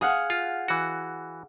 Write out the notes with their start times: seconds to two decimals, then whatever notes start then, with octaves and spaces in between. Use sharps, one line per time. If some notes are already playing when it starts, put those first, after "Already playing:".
0.01 G#4 F5 F#5
0.30 F4
0.68 E3 F#4